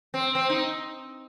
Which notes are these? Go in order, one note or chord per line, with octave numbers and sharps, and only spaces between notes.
C4
C4
D#4